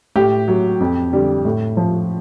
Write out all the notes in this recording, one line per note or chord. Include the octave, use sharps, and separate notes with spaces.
A2 G4
F#3
F2
D3 G3
A2
F3